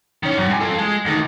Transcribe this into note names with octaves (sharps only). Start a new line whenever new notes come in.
D#3 C#4
F#2
G2 G#5
F4 A4
G#3
D2 D#3